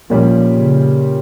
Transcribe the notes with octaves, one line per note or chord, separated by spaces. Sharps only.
A#2 F3 G3 C#4 G4
C#3